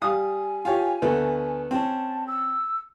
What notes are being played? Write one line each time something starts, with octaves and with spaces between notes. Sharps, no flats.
G3 F5 G#5 D#6
F4 G4 C#5
D2 A3 B3
C4 C#4 A5
E6